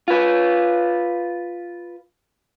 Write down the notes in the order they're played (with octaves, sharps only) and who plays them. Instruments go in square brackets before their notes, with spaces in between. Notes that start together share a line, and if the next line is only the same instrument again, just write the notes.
[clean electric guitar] F4 B4